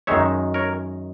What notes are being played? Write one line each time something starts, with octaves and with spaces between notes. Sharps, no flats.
F#2 D#3 G#3 D#4 C#5 E5
A#4 C#5